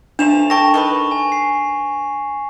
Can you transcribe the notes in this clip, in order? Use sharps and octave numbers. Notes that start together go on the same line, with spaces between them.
E3 F3 A3 D4 E7 F7
A4 G5 A5 C#6 A#6
D#3 A4 B4 C#6
G#5
C7